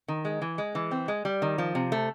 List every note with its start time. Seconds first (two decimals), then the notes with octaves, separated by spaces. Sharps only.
0.08 D#3
0.25 G#3
0.42 E3
0.58 G#3
0.75 E3
0.91 C4
1.08 G#3
1.25 G3
1.42 D#3
1.58 F3
1.75 C3
1.92 A3